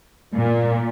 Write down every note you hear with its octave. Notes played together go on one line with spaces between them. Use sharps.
A#2